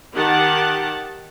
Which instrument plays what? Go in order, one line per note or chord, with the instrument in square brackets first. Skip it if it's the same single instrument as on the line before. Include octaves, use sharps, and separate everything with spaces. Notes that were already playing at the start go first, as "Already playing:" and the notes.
[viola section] D#3 G4 F#5 A5